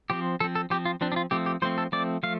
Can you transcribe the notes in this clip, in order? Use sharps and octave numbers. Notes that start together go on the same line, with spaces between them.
F3 C4 G4
F3 C4 A4
A4
F3 C4 G4
F4
F3 C4 D4
D4
F4
F3 A3 C4 G4
G4
F3 A3 C4 C5
A4
F3 A3 C4 D5
F3 A3 F5